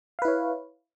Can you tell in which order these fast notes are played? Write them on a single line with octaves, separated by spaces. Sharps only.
F5 B4 E4 C#5